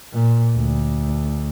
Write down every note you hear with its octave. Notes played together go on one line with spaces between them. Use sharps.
A#2
D2